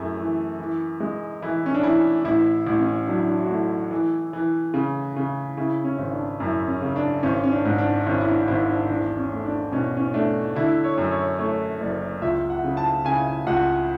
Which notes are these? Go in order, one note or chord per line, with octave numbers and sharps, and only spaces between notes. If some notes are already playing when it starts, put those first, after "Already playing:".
Already playing: F#2 A3 E4 G#4
E3
E3
G#3
E3 E4
C#4
D4
E3 E4
A1 E4
A1
C#4
F#3 D4
E4
D4
F#4
A3 E4
E3
E3
C#3
C#3
C#3 E4
C#4
G#1
D4
F#2 E4
C#4
C#3
D4
G#1 C#4
C#4
D4
G#2
D4
G#1 C#4
E4
D4
G#1 E4
D4
E2 D4
C#4
A3
D4
B2 C#4
C#4
A3 D4
D3 E4
C#5
F#2
C#5
A3 C#5
F#1 D5
C#2 E5
F#5
C#3
A5
C#3 G#5
C#2 F#5